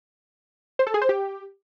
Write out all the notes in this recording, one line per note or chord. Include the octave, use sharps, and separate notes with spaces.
C5
A4
G#4
C5
G4